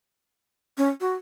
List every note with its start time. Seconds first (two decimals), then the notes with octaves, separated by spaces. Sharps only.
0.78 C#4
1.01 F#4